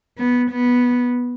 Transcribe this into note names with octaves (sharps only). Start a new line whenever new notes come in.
B3
B3